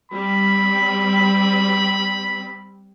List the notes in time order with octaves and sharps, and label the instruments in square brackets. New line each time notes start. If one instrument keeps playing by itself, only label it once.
[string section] G3 C4 [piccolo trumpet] B5